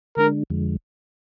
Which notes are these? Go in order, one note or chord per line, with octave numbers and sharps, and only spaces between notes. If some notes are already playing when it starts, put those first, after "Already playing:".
D3 G#3 D4 A#4
F2 D3 F3 G#3